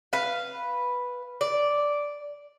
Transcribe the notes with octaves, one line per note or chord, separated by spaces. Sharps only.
B4 F5
D5